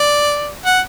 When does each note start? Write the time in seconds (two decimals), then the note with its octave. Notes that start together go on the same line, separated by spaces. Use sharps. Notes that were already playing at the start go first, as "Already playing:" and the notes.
Already playing: D5
0.66 F#5